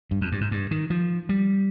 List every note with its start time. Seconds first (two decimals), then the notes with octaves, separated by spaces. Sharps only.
0.11 G2
0.21 F2
0.32 G2
0.41 G#2
0.51 G2
0.71 D#3
0.90 F3
1.29 G3